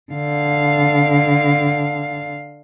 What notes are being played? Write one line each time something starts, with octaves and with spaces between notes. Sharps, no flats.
D3 F5